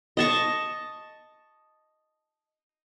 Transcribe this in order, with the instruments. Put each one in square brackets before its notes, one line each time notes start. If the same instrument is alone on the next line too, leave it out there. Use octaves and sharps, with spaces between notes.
[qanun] D#5 A5 C#6